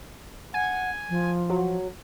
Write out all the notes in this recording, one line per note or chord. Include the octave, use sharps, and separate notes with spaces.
F#5 G#5
F3
F#3